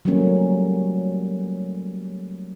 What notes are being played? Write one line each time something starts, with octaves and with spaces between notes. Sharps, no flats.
F#3 G3 A3 A#3 C#4